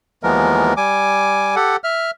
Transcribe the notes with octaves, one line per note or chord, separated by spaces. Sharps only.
D#2 E3 F3 G#3 B3 A#4
G3 G#5 D6
G4 A4 F#5
E5 F6